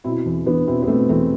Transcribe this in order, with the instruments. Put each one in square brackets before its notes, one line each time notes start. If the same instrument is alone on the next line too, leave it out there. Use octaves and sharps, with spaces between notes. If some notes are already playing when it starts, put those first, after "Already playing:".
[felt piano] B2 C4 E4
E2
E2 B3 D4
B2 C4 E4
B3
B2 A3 C4
E2 A3 C4